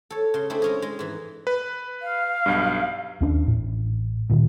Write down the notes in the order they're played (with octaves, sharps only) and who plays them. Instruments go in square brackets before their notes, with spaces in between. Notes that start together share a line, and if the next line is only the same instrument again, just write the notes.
[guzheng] A4 C#5
C#3 C6
A3 C4 D4 E4 G#4
G#3 C#4 G#4
G#3
G#2 E3
[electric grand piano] B4
[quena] F5
[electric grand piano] B1 G2
[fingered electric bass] D#2 C#4 D4
A1 A2
D2 A#2 D#3